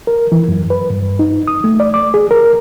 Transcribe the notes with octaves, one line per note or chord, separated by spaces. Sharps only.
A#4
E3
F#2
B4
G2
D#4
D#6
A3
D5
D6
G#4
A#4